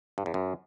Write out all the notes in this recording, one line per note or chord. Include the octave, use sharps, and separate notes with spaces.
G2
E2
F#2